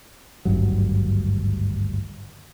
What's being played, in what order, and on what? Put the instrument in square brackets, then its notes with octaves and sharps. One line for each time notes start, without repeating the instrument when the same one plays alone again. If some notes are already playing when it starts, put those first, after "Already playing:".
[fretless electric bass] G#1 D2 G2 F#3